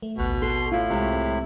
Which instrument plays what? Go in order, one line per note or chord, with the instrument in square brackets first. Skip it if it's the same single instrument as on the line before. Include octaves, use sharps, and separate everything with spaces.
[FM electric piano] A3
[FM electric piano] A1 D2 F#6 [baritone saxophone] B2
[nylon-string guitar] A4 [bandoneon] C6
[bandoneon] A2 E4 [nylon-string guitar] F4
[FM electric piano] C2 G#3 C#6 [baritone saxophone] C3